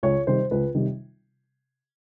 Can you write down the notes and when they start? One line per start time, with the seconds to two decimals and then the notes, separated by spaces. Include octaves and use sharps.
0.03 C#2 C#5
0.27 C3 D#3 G3 C5
0.51 C#2 B4
0.75 C3 D#3 G3